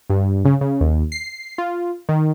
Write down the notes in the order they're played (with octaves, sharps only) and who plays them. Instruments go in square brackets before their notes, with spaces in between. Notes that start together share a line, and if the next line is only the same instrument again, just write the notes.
[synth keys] G2
C#3
C#3
D#2
C7
F4
D#3